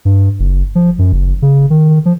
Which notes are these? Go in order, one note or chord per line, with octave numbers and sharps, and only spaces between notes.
G2
F#1
F3
F#2
F#1
C#3
D#3
F3